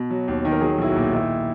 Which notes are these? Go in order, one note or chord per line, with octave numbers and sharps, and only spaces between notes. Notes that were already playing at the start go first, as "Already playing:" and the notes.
Already playing: B2
F#3
D#2
D#3
A#4
F#3 G#4
B1 E4
F#4
A#2
D#3 E4